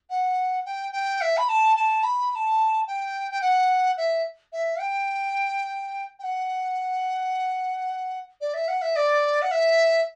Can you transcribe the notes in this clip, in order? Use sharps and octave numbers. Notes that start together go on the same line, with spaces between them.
F#5
G5
G5
E5
B5
A5
A5
B5
B5
A5
G5
G5
F#5
E5
E5
G5
G5
F#5
D5
E5
F#5
E5
D5
F#5
E5